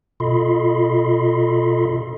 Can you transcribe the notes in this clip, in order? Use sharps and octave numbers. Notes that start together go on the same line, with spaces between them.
B2 F4 A4 D#5 B5 C6